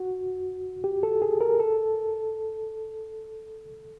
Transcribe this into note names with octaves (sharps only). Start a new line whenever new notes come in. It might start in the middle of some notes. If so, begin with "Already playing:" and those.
Already playing: F#4
G4
A4
G#4
A#4
A4